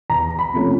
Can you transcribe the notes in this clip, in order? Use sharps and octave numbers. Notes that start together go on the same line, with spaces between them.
E2 A#5
B5
C3 F3 A3 C#4